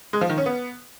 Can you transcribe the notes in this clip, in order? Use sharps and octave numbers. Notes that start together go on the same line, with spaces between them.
G#3
F3
D#3
C#4
B3